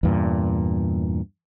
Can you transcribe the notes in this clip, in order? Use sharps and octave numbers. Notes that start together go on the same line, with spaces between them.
E2 G2 A#2